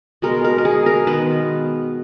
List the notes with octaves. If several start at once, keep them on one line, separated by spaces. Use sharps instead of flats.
B2 G#3 B3 A#4
A#4
A#4
G#4
A#4
D#3 G#3 B3 B4